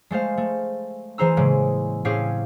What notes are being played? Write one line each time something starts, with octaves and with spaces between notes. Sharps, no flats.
G#3 A3 C5 F5
A3
E3 G#4 C5 A#5 E6
A2 C#3 G#3 A#3
A2 C4 C#4 G4 G#4 F5